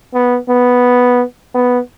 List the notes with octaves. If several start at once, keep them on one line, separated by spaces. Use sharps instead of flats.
B3
B3
B3